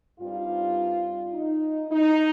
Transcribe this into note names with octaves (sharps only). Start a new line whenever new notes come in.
G2 G3 C4 D#4 F4
D#4
D#4